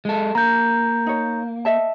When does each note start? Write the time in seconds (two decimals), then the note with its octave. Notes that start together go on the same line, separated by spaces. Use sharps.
0.05 G#3 A4
0.35 A#3 A#5 G6
1.06 D#4 C#5
1.65 D#5 E5 A5